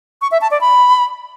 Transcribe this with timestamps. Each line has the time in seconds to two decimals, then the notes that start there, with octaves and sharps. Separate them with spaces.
0.22 C#6
0.31 E5
0.41 A5
0.51 D5
0.61 B5